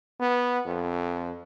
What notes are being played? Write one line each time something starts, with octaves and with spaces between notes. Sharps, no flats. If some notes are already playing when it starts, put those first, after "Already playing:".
B3
F2